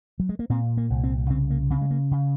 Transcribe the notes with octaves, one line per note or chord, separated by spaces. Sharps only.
F#3
G#3
A#3
A#2 C4
A#3
C2
C4
C#3 C4
A#3
C#3 C4
G#3
A#3
C#3